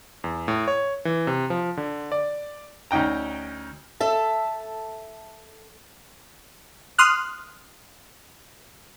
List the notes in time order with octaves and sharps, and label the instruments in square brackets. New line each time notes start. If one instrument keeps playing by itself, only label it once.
[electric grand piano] E2
A2
C#5
E3
C3
F3
D3
D5
[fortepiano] D2 C#4 D#4 G5 A#5
[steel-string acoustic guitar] A4 E5 A5
[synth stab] C6 D#6 F6 F#6